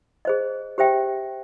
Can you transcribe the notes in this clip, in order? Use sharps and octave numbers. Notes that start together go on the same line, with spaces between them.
G#4 C5 D#5
G4 C5 E5 G5